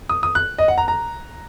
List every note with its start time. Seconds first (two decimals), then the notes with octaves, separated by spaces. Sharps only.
0.09 D#6
0.23 D#6
0.35 F#6
0.58 D#5
0.68 F#5
0.78 A#5
0.88 A#5